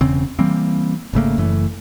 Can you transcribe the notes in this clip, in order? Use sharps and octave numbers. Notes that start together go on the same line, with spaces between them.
E1 E2 C#3 C4
E3 G3 A#3 C4
G#1 C#3 A3 A#3
F#1 F#2 E3 A3